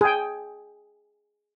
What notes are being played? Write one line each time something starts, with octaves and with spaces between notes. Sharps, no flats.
G#4 G5